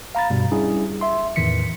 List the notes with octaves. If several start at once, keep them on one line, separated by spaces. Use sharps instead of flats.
F5 A#5 B5 A6
G2 B2 G3
G3 C#4 D4 E4 G#4
E5 C6
E2 A2 D#3 E3 B6 C#7